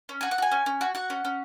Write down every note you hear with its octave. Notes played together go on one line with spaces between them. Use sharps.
C#4
F#4 G#5
F#5
F#4 G#5
C#4
C#4
F#4
F#4 F#5
C#4
C#4